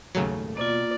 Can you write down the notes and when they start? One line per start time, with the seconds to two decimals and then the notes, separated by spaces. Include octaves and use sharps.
0.15 D#1 G#1 D#2 C#3 F#3 A3
0.57 B2 A#3 F4 D5